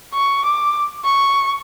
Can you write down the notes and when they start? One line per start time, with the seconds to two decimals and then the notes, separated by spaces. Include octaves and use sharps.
0.14 C#6
0.45 D6
1.05 C#6